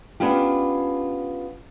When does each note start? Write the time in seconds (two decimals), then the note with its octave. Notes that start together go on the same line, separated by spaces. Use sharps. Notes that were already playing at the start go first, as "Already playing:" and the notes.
0.20 B3 C#4 D4 F4 G4